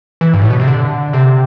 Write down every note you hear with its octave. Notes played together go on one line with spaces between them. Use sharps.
E3
G2
A2
B2
C3
D3
C3